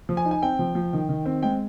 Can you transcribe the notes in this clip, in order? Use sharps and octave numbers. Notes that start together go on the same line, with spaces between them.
F3
G#5
D#4
G#5
C4 G5
F3
F3
D#3
D#3
C4
G#3 G5